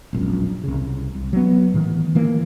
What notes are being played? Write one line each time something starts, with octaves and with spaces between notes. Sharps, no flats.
E1 A#1 F#2
C2 C#3
C2
F#3 B3
A2 D#3 E3
D#3 E3 A#3